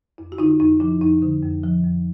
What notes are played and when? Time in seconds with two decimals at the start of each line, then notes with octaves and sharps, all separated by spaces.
0.18 F2 E4
0.32 F#4
0.38 D3 D#4 F4
0.60 F2 D#4 F4
0.80 F3 E4
1.01 F2 D#4
1.22 D3
1.42 F2
1.64 F3
1.84 F2